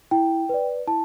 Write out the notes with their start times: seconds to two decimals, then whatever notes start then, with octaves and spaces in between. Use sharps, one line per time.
0.11 E4 G5
0.49 B4 D5
0.87 E4 A5